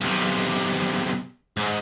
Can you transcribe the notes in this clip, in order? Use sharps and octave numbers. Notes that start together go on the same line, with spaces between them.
B1 C3
G#2